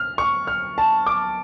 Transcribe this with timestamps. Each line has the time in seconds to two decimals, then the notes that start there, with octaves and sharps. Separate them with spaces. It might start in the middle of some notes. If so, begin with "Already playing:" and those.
Already playing: F6
0.18 C#6
0.47 F6
0.78 A5
1.06 D6